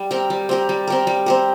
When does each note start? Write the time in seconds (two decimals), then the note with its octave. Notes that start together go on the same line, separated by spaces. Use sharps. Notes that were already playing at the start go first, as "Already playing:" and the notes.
Already playing: G3
0.11 C4 G4 A#4
0.30 G3
0.49 C4 G4 A#4
0.69 G3
0.87 C4 G4 A#4
1.07 G3
1.26 C4 G4 A#4